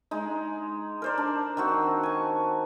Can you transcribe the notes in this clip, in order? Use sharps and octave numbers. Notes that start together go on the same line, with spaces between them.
G#3 D#4
A#4 C5 D5
D4
D#3 C4 F#4
G#5 A5